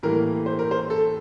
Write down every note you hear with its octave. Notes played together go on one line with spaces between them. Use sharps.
A2 E3 G3 A#3 A#4
C5
A#4
C5
A4